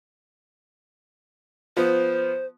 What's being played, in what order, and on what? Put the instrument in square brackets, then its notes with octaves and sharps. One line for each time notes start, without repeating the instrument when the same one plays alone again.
[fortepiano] F3 B3 [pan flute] C5